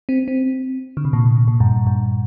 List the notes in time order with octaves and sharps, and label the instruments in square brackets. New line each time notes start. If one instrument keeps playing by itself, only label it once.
[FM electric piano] C4
C4
D3
C3
A#2
A#2
G2
G2